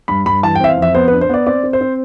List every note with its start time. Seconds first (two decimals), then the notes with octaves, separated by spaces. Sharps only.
0.08 G2 B5
0.26 G2 B5
0.43 E3 A5
0.55 G5
0.60 C4 E5
0.69 F5
0.77 F2
0.82 E5
0.95 B3 C5
1.08 B4
1.12 D4
1.21 C5
1.29 B3 D5
1.46 C4 D5
1.64 C4
1.73 C5
1.81 C4